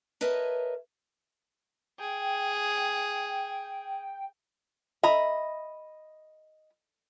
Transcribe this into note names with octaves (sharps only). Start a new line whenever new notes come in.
A#4 B4 C#5 D#5 E5 A5
G#4 G5
D#5 E5 A#5 B5